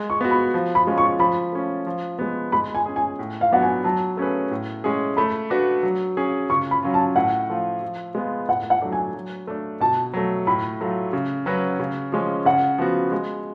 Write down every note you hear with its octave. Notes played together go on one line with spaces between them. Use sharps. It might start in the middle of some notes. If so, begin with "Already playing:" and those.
Already playing: G#3
C#6
B3 F#4
B5
F3
B5
G#3 C#4 F4
C#6
F3 B5
A3 C#4 F4
F3
G#3 B3
G#3 B5
G#5
C#4 G#4
G#5
A2
F5
F#3 B3 D4 F#4 F#5
G#5
F#3 A5
A3 C#4 G#4 B4
A2
G#3 C#4 G#4
A3 B5
D4 F#4 B4
F#3
C#4 G#4
C#3 C#6
B5
F#3 C#4 F4
A5
A2 F#5
F3 A3 F4
F3
G#3 B3 F4
A2 F#5
F#5
F#3 A3 D4
G#5
F#3
A3 D4
B2 A5
F#3 A3
A2 B5
F#3 A3 F4
C#3
F#3 C#4 F#4 B4
C#3
F3 G#3 C#4
C#3 F#5
F3 B3 F#4
G#3